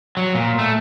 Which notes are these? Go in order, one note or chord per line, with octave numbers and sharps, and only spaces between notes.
F#3
A#2
A3